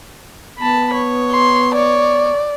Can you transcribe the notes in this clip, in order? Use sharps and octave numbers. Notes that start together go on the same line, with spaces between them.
B3 A5 B5
C#5
C6
C#5 D5